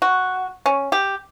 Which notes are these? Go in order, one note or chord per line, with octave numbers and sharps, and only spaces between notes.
F#4
C#4
G4